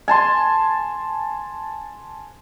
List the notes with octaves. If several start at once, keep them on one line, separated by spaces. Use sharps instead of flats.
G#5 A5 C6